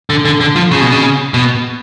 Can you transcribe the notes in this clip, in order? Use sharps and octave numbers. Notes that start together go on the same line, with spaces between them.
D3
D3
D3
F3
C#3
B2
C#3
B2